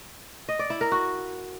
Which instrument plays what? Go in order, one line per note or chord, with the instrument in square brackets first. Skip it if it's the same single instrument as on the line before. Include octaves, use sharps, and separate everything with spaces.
[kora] D#5
D5
E4
A#4
F#4